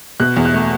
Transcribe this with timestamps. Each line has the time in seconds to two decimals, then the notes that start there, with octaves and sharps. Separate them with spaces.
0.20 B2 F#6
0.37 E2
0.45 F#6
0.54 A3